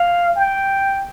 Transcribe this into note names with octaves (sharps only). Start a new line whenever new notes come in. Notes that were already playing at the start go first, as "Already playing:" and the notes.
Already playing: F5
G5